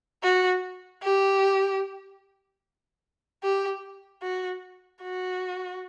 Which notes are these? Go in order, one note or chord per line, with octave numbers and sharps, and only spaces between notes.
F#4
G4
G4
F#4
F#4